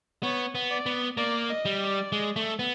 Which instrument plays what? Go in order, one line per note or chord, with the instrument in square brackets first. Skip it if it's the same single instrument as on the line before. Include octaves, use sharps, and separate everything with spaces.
[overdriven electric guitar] B3 [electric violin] C#5
[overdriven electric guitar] B3
[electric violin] D5
[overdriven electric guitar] B3
[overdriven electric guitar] A#3 [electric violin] D5
[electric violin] D#5
[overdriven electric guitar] G3
[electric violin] D5
[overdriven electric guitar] G#3
A3
B3